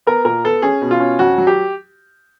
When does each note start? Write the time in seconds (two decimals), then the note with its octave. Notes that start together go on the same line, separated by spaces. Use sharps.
0.07 B3 A#4
0.25 A#2 A#4
0.44 B3 A4
0.62 C#4 G#4
0.82 B2
0.91 F4
1.00 C#4
1.19 F2 F#4
1.38 F#3
1.47 G4